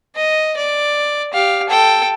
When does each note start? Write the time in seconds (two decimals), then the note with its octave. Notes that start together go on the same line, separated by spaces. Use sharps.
0.16 D#5
0.57 D5
1.33 G4 F5
1.69 A4 G5